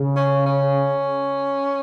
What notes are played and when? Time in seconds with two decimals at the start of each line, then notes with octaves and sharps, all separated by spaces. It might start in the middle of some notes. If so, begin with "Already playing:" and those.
Already playing: C#3
0.16 C#4
0.46 C#4